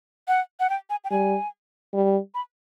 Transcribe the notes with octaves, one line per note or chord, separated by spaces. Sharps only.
F#5
F#5
G5
G#5
G5
G3 G#5
G3
B5